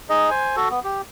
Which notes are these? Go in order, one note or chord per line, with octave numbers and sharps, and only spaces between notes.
D#4 G#4 D#5
C5 G#5
F#4 A4
B3
G4